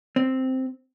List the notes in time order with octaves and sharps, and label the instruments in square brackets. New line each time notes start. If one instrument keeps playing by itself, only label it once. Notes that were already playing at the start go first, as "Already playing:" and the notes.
[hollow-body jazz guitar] C4